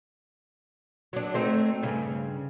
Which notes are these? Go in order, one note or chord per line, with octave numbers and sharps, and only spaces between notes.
F#3 D4
A3 C4 D#4
G2 C#3